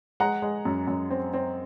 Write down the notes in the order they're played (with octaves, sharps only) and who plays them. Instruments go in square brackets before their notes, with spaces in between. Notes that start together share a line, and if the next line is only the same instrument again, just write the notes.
[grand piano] G#3 F#5 A#5
G#3
F#2
F#2
C4
C4